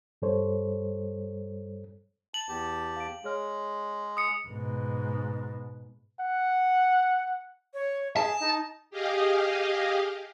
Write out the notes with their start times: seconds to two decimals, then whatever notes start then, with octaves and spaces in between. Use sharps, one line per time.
0.22 G2 G3 A4 C5 C#5
2.34 A5 F#7
2.49 E2 G4 A5
2.96 F5 D7
3.24 G#3 G#4 C#5 F6
4.17 D#6 C#7
4.48 G#2 B2
6.20 F#5
7.74 C#5
8.17 G#4 A5
8.40 D#4
8.90 G4 G#4 D#5 F5